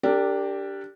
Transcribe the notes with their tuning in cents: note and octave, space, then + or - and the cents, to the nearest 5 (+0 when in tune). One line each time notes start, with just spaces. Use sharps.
D4 -10 G4 +0 A#4 -40